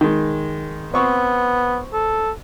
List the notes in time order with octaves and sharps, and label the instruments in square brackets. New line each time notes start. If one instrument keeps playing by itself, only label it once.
[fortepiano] D#3 G#3
[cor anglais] B3 [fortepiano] C4 C#6
[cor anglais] A4